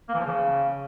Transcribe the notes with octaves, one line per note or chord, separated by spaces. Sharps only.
A#3
E3
F3
C#3